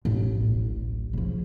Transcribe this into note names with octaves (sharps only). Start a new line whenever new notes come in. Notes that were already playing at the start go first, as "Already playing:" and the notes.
A1
D1 A1
C#3 F3